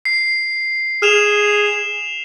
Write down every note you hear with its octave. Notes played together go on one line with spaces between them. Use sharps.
C7
G#4 F6 E7 F7